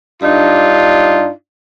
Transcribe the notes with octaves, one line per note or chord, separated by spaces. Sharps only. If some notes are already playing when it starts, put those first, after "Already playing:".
G2 D4 D#4 F4